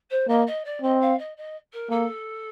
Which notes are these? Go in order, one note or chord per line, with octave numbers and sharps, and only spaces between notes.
C5
A#3 D#5
D#5
D5
C4 D#5
F5
D#5
D#5
A#4
A#3 A4